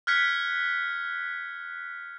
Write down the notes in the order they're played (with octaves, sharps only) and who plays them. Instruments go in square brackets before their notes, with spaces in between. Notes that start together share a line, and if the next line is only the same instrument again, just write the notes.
[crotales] F6 F#6 G#6 B6 C#7